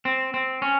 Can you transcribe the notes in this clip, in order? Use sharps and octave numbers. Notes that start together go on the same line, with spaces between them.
C4
C4
C#4